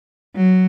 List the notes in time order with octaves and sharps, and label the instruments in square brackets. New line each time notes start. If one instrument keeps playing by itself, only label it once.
[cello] F#3